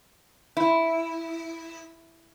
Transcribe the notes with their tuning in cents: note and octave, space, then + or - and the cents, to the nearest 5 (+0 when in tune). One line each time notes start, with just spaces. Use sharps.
E4 -5